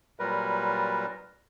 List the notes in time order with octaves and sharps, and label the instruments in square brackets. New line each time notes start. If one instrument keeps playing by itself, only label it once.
[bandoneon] A#2 F#3 G3 A#4 B4